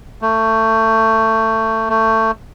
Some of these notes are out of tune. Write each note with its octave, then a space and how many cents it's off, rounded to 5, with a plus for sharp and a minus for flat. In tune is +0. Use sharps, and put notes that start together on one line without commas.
A3 +20
A3 +20